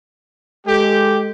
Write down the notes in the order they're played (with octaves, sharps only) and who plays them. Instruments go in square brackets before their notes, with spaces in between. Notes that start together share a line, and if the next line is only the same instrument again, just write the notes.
[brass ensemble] G#3 A4 [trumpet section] G4